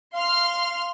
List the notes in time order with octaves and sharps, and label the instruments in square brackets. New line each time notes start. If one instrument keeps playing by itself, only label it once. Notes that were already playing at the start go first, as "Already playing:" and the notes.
[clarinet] F5 [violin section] C6 F6